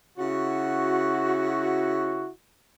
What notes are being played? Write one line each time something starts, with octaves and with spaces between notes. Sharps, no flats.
C#3 E4 F#4